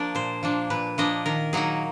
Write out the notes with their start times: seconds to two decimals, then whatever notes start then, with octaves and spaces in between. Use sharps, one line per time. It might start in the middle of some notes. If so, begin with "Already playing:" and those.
Already playing: F3 A#3 D4 D5
0.15 A#2 C5
0.43 F3 A#3 D4
0.70 A#2 B4
0.98 F3 A#3 D4 D#5
1.26 D#3 A#4
1.53 F#3 A#3 D#4 G#4